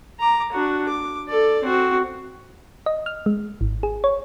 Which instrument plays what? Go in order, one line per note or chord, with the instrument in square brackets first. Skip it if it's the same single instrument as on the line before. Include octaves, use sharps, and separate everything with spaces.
[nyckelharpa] A#5 D6
D4 F#4
D6
A4 D5
C4 F#4
[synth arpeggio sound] D#5
F6
G#3
G#1
G#4
C#5